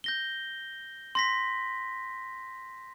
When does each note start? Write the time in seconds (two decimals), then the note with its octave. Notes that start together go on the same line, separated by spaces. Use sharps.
0.04 G6 A#6 G7
1.15 C6 A#6 B6